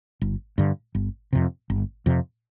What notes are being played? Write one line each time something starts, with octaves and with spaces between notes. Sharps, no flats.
G1
G2 D3
G1
F2 C3
G1
F2 C3